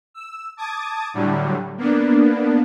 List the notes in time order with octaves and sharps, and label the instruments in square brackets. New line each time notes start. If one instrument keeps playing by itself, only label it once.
[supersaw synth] E6
A5 D6 D#6 G#6 A6
A2 D3 F#3 G3
A#3 B3 D4